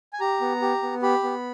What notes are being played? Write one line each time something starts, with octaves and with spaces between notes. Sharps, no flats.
G#5
G4 A#5
B3
G4
B3
G4 B5
B3